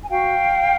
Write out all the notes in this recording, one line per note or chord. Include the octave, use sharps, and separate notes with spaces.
G#5
F#4 F5 G5